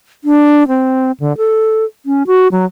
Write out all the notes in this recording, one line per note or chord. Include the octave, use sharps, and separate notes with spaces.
D4
C4
D3
A4
C#4
F#4
F#3